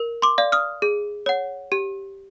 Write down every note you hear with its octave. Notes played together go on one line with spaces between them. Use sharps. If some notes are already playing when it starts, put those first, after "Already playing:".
Already playing: A#4
C6 D6
D5 F5
D#6 F6
G#4
C#5 F#5
G4